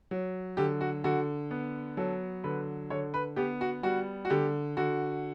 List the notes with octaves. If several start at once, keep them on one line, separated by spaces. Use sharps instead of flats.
F#3
D3 G4
F#4
D3 F#4
B3
F#3 A4
D3 B4
D3 C#5
B4
B3 G4
F#4
G3 F#4
F#4
D3 G4
D3 F#4